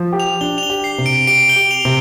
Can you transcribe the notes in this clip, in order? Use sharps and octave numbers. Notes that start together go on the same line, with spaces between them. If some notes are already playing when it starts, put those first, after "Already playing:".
Already playing: F3
G4
F7
D4 G7
F7
G7
G4
C7
C3
D7
G4 D7
G7
G4
F7
C3